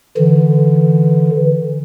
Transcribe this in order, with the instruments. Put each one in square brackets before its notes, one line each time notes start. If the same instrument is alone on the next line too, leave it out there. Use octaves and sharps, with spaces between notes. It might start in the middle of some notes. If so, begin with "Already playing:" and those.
[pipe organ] D3 E3